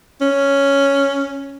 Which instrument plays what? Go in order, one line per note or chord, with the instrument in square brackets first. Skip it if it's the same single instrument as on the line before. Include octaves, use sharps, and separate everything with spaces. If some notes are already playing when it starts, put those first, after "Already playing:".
[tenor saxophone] C#4